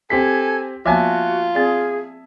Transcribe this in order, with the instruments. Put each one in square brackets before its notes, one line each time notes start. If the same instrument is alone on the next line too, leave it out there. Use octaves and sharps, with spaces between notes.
[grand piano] C4 G4 B6 [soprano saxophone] A4 [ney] G#5
[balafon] F3 A#3 B3 [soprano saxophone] F4 [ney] F#4 [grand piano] E5 G#5 A5
[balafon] C4 D5 [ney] G#4